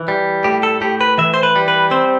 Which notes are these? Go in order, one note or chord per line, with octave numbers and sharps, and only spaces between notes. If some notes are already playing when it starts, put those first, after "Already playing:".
Already playing: E3
G3
A2 G4
A4
A2 G4
B4
E3 E5
C5
B4
G3
B4
C4 C5